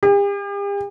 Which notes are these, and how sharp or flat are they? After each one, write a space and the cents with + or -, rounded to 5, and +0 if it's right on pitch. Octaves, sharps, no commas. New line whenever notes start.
G4 +45